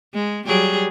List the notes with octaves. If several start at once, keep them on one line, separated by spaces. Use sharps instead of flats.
G#3
F#3 G3 G#4